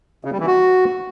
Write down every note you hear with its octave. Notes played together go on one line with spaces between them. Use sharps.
C#3
G3
E3
F#4